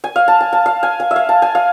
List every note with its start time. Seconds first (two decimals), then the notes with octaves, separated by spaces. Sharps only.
0.04 G#5
0.16 F5
0.28 A5
0.41 G#5
0.53 A5
0.66 F5
0.83 G#5
1.00 G#5
1.11 E5
1.16 F5
1.29 A5
1.42 G#5
1.55 F5